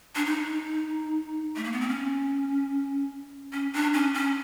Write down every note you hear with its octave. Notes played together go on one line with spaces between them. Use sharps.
D4
D#4
A3
A#3
B3
C4
C#4
C#4
D4
C#4
C#4